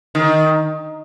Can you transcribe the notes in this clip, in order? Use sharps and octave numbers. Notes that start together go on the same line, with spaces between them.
D#3